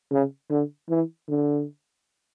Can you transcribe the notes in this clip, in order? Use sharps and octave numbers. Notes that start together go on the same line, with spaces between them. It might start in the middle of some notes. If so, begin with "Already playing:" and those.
C#3
D3
E3
D3